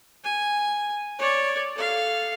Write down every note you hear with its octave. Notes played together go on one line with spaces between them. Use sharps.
G#5
C#5 D5
A4 F5